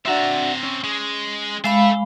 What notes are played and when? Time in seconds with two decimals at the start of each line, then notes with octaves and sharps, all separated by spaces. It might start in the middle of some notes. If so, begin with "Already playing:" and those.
0.06 C4 D4 F#4 E5 A#5
0.63 C#4
0.84 G#3
1.64 G#3 A4 E5 F5 B5